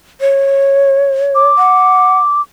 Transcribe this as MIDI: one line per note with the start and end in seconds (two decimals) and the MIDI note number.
0.21 1.47 73
1.35 2.41 86
1.58 2.18 78